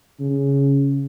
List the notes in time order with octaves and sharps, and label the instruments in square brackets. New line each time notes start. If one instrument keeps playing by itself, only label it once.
[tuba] C#3